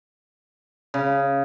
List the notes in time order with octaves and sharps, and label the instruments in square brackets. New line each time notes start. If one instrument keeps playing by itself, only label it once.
[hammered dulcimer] C#3